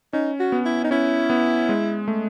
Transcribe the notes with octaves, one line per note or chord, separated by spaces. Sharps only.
C#4 D#4
F#4
B3
E4
D#4
C#4 E4
B3
G#3
A3